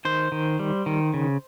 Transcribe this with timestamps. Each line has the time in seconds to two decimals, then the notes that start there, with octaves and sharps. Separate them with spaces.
0.05 D#3 C5
0.32 D#3
0.59 G3
0.86 D#3
1.14 C#3